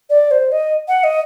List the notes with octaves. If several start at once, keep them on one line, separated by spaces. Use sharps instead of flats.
D5
C5
D#5
F#5
D#5